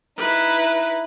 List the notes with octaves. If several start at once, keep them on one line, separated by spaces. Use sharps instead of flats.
D#4 E4 B4